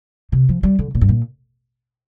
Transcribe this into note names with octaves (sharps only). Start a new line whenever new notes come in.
C3
F3
G3
D3
A#2
G2
A#2